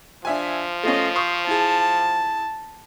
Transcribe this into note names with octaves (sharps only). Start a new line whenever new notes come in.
F3 D4 E5 G#5
A3 C#4 F4 D#5
C5 C#6 D#6
E4 G#4 A5